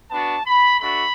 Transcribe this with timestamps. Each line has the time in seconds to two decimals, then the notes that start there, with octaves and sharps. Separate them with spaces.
0.11 B3 D4 F#4 A5
0.45 B5
0.79 A3 D4 F#4 B5